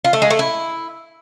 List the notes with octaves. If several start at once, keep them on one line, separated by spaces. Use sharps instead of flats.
F4
A3
G#3
A3
E4